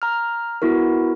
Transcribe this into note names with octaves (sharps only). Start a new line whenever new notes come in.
A#5 F6
B3 E4 F#4 A#4